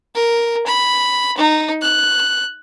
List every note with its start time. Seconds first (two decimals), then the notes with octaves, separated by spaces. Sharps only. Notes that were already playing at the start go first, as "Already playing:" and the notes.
0.15 A#4
0.67 B5
1.38 D#4
1.82 F#6